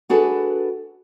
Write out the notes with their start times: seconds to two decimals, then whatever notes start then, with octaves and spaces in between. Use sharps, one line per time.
0.09 D4 F#4 G#4 A4 B4